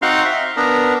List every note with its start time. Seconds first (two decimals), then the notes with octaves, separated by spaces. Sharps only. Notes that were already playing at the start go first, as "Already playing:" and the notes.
0.02 C4 D#4 F#4 F5 C6
0.25 E5
0.57 B3 D4 A#4